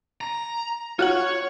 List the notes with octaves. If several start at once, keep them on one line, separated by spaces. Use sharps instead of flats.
A#5
F4 F#4 C#5 F#5